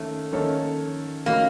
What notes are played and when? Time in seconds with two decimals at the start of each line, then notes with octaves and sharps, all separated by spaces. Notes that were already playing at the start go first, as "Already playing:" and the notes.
Already playing: D#3 A3 A#3 C#4
0.32 D#3 A#3 C#4 A4 C#5
1.26 D#3 A3 A#3 C#4 F#4